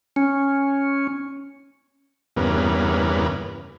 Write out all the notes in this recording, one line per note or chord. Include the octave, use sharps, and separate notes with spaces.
C#4
E2 G2 C#3 A#3 B3